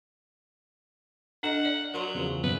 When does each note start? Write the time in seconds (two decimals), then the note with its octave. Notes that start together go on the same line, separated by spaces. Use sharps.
1.43 D4 A4 D#5 F#5
1.65 D5
1.94 F#3 A#4 C6
2.14 E2 C#3 F3
2.43 F#2 B2 C4 B4